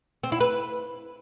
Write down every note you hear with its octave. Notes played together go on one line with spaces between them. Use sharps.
C4
E4
B4